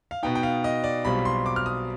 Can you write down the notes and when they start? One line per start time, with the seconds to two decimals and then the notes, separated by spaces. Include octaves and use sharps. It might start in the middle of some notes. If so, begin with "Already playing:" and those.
0.11 F5
0.23 B2 B3 D#4 G5
0.35 G5
0.43 F5
0.64 D#5
0.84 D5
1.05 B1 B2 G3 C4 F4 B5
1.25 C6
1.46 D6
1.56 F6
1.66 D#6